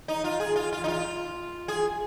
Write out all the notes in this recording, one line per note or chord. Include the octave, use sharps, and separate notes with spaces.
D#4
F4
G#4
F4
F4
D#4
F4
G#4